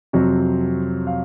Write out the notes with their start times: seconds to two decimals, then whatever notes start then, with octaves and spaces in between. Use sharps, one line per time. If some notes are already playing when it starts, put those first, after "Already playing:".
0.13 F2 C3 F#3 C4 F#4
1.07 F5